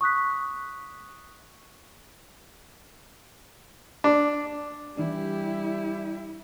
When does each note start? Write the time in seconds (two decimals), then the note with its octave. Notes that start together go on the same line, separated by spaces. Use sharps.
0.01 C#6 D#6 F#6 B6
4.04 D4
4.97 E3 G3 D4 E4 G4